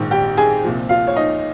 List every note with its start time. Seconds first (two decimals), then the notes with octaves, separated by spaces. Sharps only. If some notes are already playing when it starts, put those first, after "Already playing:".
Already playing: A#1 G#2 D#3
0.11 G4 G5
0.37 G#4 G#5
0.64 C2 A#2 F3
0.89 F4 F5
1.07 C#5
1.16 D#4 D#5